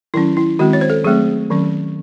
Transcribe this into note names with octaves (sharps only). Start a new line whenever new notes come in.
D#3 F#3 C#4 E4
E4
D#3 G#3 C4 F#4
C#5
C5
A4
F#3 A3 C4 G#4
D#3 F#3 C#4